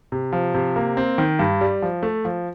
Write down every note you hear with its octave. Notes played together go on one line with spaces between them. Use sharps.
C3
F3
C3
A#3
C4
D#3
G2
G3
F3
A3
F3